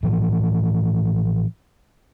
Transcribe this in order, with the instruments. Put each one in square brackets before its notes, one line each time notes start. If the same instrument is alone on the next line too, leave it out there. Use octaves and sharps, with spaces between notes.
[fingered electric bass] A2 E3 F3